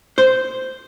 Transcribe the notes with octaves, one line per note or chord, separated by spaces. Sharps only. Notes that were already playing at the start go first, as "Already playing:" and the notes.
C5